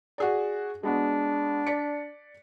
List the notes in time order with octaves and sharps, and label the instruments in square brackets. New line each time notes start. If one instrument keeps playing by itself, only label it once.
[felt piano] F#4 G#4 D5
[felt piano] G#3 B3 F#4 [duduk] D4
[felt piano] D5 B6 C#7